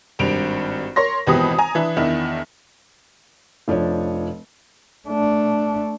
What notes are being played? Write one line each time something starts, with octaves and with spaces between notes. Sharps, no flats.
G#1 G2 D7 F7
A#4 C#5 C6 A#6
G#1 B2 E3 G4 B5 D#6
G#5 A#5
E3 D4 E4
E2 D#3 D4 E4
F1 F3 D4 C#5
A3 D4